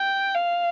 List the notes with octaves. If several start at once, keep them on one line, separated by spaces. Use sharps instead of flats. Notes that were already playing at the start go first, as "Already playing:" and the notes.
Already playing: G5
F5